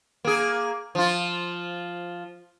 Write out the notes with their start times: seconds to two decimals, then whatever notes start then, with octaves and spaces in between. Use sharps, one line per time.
0.25 A#3 G#4
0.95 F3 F4